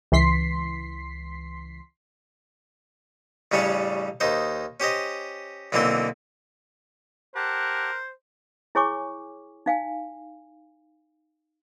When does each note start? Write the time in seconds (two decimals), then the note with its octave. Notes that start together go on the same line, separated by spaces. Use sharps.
0.12 C#2 E3 C6 B6 C7
3.52 A1 C#3 G3 C#4 D4 C#5
4.20 D#2 D#4 C5
4.80 C#4 G4 C5 D#5
5.72 B1 D3 E3 A#3 C4 C6
7.35 G4 A#4 C5 F#5 A5 F#6
8.75 E4 G#4 C#5 G#5 C#6 D6
9.66 D#4 F5 G#5